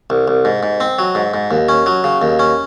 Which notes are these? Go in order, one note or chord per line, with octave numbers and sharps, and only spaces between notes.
C2
C2
G#2
G#2
C4
F#3
G#2
G#2
D#2
C#4
F#3
C#3
D#2
C#4